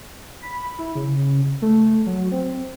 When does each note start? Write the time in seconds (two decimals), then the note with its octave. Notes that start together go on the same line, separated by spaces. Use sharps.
0.41 B5
0.79 E4
0.95 C#3
1.62 A3
2.06 F#3
2.32 C4